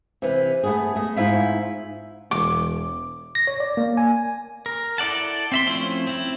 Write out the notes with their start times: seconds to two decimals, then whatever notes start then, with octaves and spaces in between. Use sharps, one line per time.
0.22 C3 E3
0.63 A3 B3 G#4
0.95 A3 D#5
1.17 G#2 E4 F4 E5
2.31 E1 D6
3.35 A#6
3.47 C#5
3.60 D5
3.77 A#3
3.97 G#5
4.66 A#4
4.98 E4 A4 D5 F#5 A5
5.52 C4 E5 C6
5.67 F3 A3 C4 C#4 E4
6.07 C4 E4